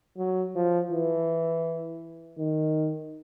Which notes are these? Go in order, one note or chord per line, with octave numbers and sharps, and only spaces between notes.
F#3
F3
E3
D#3